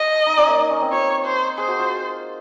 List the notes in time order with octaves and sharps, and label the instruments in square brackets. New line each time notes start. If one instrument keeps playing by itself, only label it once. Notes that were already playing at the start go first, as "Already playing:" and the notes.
Already playing: [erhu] D#5
[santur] D#4
C#4
A#3
D#4
C#4
C4
[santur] F4 [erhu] C#5
[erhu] C5
[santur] G#4 [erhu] C5
[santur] F#4
F4